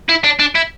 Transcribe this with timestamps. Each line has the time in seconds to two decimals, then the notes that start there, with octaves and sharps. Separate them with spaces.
0.09 E4
0.24 D4
0.39 D4
0.55 E4